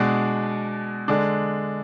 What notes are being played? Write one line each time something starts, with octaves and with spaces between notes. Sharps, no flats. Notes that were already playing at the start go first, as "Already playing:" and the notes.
Already playing: B2 G#3 D4
D3 G#3 D4